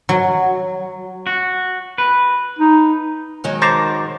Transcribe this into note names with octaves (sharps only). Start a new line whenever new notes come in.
F#3
F#4
B4
D#4
D#3 F#3 G#3
A#4 C5 A5 A#5 C#6 D6